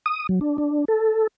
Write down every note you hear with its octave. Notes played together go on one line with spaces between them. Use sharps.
D#6
F#3
D4
D4
A4